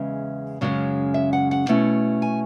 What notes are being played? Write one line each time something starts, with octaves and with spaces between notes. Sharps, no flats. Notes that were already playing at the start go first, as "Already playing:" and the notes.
Already playing: E2 C#3 G#3 E5
F#2 C#3 G#3 C#4
E5
F#5
F#5
B2 A3 C#4 E4
G#5